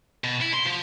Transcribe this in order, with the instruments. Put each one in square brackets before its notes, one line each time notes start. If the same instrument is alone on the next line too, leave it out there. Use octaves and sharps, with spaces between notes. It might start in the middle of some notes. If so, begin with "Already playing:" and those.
[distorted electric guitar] B2
E4
C6
F3